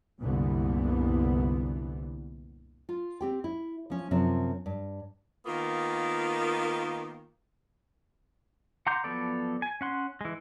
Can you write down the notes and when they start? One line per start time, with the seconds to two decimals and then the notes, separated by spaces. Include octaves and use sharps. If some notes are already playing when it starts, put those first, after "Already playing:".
0.20 C2 F#2 A#2 D3 E3 B3
2.89 F4
3.21 C4 G4 G5
3.44 E4
3.90 F3 C#4
4.11 F#2 C3 F3 C4
4.66 G2
5.46 D#3 A#3 B3 F4
8.87 F#5 A#5 C6 D6 G6
9.04 F3 F#3 B3 A4 D5
9.62 G#5
9.81 C#4 F#5 C6
10.21 E3 G#3